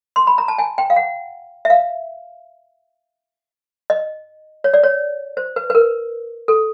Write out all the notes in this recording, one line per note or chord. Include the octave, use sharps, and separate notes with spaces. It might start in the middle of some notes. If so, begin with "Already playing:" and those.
C6
B5
A#5
A5
G#5
G5
F5
F#5
E5
F5
D#5
C#5
D5
C#5
C5
B4
B4
A#4
A4